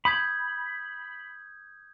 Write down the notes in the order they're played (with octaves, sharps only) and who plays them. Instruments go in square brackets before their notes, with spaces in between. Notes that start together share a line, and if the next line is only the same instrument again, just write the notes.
[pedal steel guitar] B5 [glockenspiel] D#6 G6 G#6